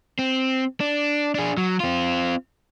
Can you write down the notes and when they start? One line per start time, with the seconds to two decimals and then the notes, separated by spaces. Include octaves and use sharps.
0.19 C4
0.80 D4
1.35 D4 G#4
1.57 F#3
1.80 C4 F4